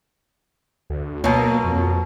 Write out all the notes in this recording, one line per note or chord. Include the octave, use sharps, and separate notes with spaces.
D2
B2 F#3 A#3
F2